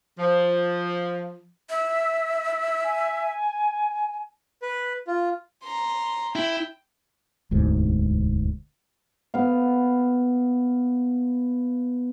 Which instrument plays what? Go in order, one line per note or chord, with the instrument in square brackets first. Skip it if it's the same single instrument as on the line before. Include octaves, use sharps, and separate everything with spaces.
[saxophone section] F3
[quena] E5
[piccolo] G#5
[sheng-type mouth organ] B4
F4
[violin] A#5 C6
[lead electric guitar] E4 [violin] G5
[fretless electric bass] E1 D2 G#2
[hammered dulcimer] B3 F5